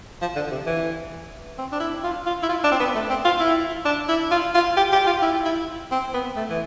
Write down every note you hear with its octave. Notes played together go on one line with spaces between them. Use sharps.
F3
D3
C3
E3
C4
D4
E4
F4
F4
E4
F4
D4
C4
B3
A3
C4
F4
E4
D4
E4
F4
F4
G4
G4
F4
E4
E4
C4
B3
A3
E3